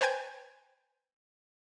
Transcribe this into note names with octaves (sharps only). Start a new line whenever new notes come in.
B4 C5 G5 G#5 G6 G#6